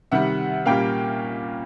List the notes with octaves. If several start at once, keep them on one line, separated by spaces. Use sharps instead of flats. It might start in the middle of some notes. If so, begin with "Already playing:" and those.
C3 D#3 G3 E5 F#5
A#2 G3 A#3 C#4 F5 G5